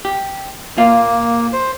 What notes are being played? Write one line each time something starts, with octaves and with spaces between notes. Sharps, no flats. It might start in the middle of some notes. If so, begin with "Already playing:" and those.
G4
A#2 A#3 F4 F5
C5